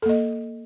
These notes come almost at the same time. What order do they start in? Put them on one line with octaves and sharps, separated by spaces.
A4 A#3 D#5